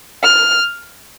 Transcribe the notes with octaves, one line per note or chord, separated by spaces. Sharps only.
F6